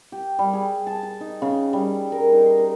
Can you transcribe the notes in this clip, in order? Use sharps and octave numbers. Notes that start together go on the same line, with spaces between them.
G4
G3
G#4
A5
A5
D#4
C#3
G3
A#4
D#4
C6
A#4